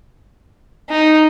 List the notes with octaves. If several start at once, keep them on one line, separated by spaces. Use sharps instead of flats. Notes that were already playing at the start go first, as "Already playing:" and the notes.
D#4